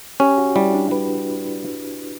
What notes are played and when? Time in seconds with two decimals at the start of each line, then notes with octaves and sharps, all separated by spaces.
0.20 C#4 G4
0.38 F#4
0.56 G3 E4
0.74 D4
0.91 G3 B4